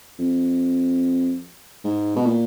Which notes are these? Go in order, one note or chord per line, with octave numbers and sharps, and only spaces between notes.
F2
G#2
B2
A#2